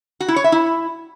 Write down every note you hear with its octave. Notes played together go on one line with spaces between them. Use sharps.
F#4
E4
C#5
E5
E4